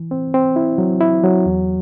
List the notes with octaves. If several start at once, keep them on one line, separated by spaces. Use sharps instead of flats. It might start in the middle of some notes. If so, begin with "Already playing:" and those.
Already playing: E3
C4
C4
E4
F#3
E4
F#3
E2